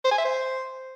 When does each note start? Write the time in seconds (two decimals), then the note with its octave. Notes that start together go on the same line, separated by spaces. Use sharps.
0.05 C5
0.11 G#5
0.18 E5
0.25 C5